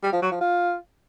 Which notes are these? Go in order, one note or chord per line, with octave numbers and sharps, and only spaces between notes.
G3
F3
F#3
F3
F4